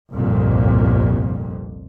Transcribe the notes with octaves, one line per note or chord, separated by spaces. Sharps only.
G1 C2 F2 A#2